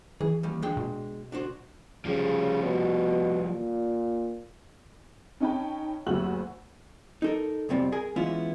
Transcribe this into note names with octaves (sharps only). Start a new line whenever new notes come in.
E3 G#4
D#2 G3
G#3 D4 G5
B2
D4 F#4 C5
C#3 F3 G3
B2
A#2
C#4 D#4 D#5 G5 A5 B5
F#1 D2 F#4 G4 E6 F#7
D#4 A4 A#4
C2 F2 B2 G3 C4 D5
G#4 A#4 G#5
E3 G#3 B3 C#4 E4 F4